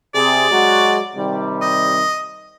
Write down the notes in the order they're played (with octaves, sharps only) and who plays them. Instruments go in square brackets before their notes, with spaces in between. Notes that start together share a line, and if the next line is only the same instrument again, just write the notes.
[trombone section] C3 G#4 [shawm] D5
[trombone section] F#3 G#3 F#4
C3 D#3 G3
[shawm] D#5